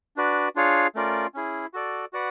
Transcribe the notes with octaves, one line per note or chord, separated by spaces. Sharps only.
D4 F#4 B4 D5
D4 F4 G#4 C#5 F5
A3 C#4 F4 A#4 D5
C#4 E4 G#4
F#4 A4 D5
F#4 B4 D5 F#5